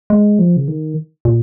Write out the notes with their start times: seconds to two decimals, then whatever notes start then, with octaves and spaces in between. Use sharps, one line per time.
0.10 G#3
0.39 F3
0.57 C#3
0.68 D#3
1.25 A#2